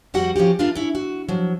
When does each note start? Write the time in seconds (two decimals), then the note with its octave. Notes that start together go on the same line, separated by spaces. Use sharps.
0.14 F2 G3 F#4 F#5
0.36 F3 C#4 F#4 G4
0.59 D4 E4 F4 A#4
0.75 C#4 E4
0.95 F#4
1.29 F3 F#3